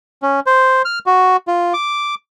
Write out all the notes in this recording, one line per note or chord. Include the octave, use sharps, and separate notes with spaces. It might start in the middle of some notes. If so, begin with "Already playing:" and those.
C#4
C5
F6
F#4
F4
D6